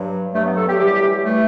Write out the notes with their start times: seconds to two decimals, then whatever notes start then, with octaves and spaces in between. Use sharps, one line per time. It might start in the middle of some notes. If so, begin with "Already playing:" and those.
Already playing: G2 F#3
0.34 G2 F#3 A3
0.45 B3
0.56 A4
0.68 G4
0.79 F#2 E3 G3 G4
1.25 E3 G3 A3